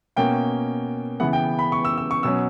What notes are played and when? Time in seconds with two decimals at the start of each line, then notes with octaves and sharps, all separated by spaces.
0.16 B2 A#3 C#4 G5
1.20 C#3 E3 B3 F#5
1.33 G5
1.59 B5
1.72 C#6
1.85 E6
1.98 E6
2.11 C#6
2.23 B2 F#3 C#4 E6